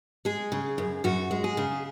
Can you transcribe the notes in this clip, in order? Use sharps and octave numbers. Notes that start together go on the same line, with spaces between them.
G#3 G#4
C#3
F#2
F#2 F#4
G#3
G#4
C#3